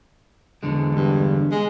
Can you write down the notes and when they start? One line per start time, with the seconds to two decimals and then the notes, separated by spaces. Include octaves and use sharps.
0.63 E2 D3 G#3
0.95 G2
1.51 G#3